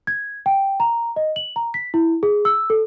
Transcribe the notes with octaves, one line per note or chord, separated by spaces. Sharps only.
G#6
G5
A#5
D#5
F#7
A#5
B6
E4
G#4
E6
A4